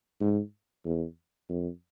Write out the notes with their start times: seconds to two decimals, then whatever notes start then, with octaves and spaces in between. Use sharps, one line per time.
0.21 G#2
0.85 E2
1.49 F2